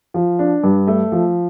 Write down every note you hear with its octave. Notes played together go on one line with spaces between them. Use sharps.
F3
D4
G2
A3
F3